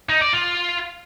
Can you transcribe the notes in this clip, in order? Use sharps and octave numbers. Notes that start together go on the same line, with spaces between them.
D#4
D5
F4